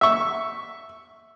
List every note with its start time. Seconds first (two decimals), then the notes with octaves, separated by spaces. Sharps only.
0.01 E5 C#6